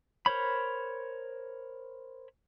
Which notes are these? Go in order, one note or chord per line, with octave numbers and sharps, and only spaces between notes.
A#4 C5 C#5 B5